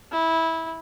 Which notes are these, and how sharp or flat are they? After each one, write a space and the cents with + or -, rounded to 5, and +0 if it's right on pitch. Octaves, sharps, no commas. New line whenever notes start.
E4 -15